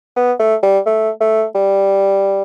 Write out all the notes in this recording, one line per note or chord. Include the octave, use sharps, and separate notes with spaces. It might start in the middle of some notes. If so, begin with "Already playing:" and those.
B3
A3
G3
A3
A3
G3